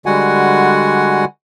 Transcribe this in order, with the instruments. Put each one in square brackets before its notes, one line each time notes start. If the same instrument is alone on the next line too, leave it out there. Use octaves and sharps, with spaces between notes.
[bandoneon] D3 G3 G#3 F#4 F#5 G#5